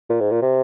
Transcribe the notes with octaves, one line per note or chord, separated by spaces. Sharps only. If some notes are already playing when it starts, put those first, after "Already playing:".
A#2
G#2
A#2
C3